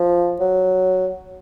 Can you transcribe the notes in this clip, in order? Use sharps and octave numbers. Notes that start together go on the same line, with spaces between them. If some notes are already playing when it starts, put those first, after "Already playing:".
Already playing: F3
F#3